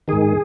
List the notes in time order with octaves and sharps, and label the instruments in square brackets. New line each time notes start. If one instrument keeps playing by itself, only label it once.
[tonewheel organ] G#2 D#3 G#4